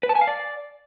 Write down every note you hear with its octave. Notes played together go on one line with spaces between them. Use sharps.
B4
A5
G#5
F5
D5